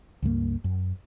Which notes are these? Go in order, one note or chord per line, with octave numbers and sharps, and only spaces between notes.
C#2 G2 F3 A#3
F#2